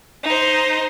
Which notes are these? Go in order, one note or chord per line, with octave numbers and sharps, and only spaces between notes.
D#4 C5